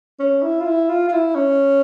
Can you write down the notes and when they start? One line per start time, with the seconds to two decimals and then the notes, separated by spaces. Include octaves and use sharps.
0.19 C#4
0.42 E4
0.60 F4
0.65 E4
0.89 F4
1.08 F4
1.12 E4
1.35 C#4